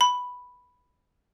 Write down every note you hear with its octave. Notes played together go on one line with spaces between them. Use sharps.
B5